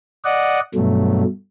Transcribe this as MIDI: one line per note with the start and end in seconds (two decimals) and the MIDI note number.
0.25 0.60 74
0.25 0.60 75
0.25 0.60 78
0.75 1.24 43
0.75 1.24 47
0.75 1.24 54
0.75 1.24 57